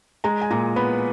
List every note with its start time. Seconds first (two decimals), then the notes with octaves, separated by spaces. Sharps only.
0.24 G#3 A#5
0.41 G#5
0.51 A#2 A#5
0.76 B3 B5